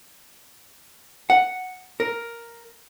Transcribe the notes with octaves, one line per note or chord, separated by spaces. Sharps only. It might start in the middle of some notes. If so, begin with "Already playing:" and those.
F#5
A#4